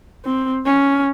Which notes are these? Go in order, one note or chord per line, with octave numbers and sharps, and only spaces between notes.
C4
C#4